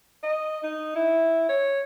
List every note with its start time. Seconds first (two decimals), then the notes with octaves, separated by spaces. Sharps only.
0.23 D#5
0.63 D#4
0.96 E4
1.49 C#5